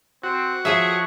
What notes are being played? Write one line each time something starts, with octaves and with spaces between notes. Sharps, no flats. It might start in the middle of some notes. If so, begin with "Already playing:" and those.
C4 F#4
F3 G#4 C#5 E5